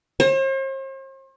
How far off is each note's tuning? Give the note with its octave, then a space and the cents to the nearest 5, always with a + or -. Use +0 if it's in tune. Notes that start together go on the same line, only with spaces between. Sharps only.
C5 +45